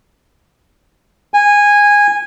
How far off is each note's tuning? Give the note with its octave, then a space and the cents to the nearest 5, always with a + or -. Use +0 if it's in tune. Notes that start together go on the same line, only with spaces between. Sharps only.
G#5 -15